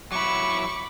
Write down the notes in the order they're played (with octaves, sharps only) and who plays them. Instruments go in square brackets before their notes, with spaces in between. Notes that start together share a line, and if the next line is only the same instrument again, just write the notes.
[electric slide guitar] F#3 E4 [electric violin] B5 D6 [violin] C#6